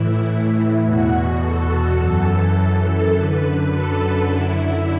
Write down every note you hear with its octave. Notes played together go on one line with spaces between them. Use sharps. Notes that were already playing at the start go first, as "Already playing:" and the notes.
Already playing: A2 E3 E4
E2 B2 F#4
A4
F#2 E3
A4
F#2 D3 B4
A4
F#2 D3 E4